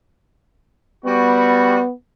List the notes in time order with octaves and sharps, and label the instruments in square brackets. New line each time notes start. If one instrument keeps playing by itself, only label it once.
[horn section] G3 F#4 [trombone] B3